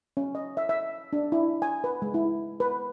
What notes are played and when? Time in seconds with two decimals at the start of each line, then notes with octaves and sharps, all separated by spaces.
0.17 C#4
0.35 D#5
0.57 E5
0.69 E5
1.13 D4
1.32 E4
1.62 G#5
1.84 B4
2.02 G#3
2.14 E4
2.60 B4